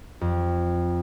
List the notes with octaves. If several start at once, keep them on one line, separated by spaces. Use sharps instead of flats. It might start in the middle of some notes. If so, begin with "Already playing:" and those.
F2